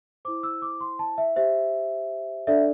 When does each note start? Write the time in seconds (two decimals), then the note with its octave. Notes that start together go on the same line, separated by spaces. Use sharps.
0.25 E4 C5 D6
0.43 E6
0.62 D6
0.81 C6
0.99 A5
1.18 E5
1.36 G4 C5 E5
2.47 D4 A4 D5 E5